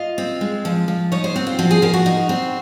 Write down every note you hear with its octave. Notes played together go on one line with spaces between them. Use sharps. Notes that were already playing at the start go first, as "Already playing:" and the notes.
Already playing: F4 D#5
C4
G#3
F3
F3
D#4 C#5
C5
C4 F#4
F4
F3 F#4
G#4
F3 A#4
F#4
D#4
C4